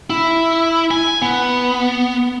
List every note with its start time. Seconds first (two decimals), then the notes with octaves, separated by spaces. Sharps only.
0.10 E4
0.91 G#5
1.22 B3